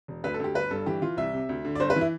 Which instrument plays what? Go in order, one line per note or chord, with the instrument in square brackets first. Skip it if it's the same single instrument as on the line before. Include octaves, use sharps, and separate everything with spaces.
[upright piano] E1
D2 B4
A4
D2 G4
G1 B4
G2 A4
E3 G4
E3 F4
C2 E5
C3
D2
D3
D5
G1 C5
B4
E3
E4